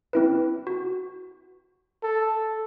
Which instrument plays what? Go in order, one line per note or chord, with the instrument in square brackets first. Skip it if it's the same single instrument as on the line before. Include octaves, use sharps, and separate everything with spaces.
[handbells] C4 E4 B4
F#4
[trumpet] A4